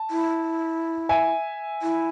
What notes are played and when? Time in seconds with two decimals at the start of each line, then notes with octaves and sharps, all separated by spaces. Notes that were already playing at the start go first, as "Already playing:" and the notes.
Already playing: A5
0.10 E4
1.09 E5 G#5
1.82 E4